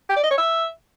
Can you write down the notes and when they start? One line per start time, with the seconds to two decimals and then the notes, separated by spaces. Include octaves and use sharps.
0.09 G4
0.16 D5
0.23 D#5
0.31 C#5
0.38 E5